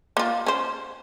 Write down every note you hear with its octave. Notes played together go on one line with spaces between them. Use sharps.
A#3 F4
C#4 C5